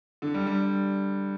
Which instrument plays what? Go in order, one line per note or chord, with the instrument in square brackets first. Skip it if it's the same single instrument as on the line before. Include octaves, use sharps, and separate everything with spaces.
[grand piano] D3
G3
G3